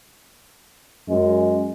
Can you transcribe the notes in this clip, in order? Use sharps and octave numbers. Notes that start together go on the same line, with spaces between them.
F#2 G#3